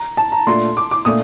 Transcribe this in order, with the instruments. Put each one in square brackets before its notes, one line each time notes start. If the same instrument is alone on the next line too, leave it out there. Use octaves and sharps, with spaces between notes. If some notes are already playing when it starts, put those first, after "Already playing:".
Already playing: [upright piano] A#5
A5
A#5
[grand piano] A#2 A3 D4 F4 A4 [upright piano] C6
[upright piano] D6
D6
[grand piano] A#2 A3 D4 [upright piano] D#6